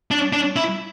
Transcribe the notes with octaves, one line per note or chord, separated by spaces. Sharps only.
D4
D4
E4